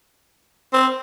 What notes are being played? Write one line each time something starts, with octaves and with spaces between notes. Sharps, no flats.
C4